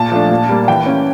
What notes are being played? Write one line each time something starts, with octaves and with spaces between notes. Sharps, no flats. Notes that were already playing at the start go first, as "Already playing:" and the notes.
Already playing: A#2 A5
F3 A3 D4
A#2
G3 A#3
E3 G5
A#3 C#4